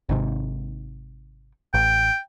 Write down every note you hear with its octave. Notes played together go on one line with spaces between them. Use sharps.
G#1 G#2 C3
A1 G5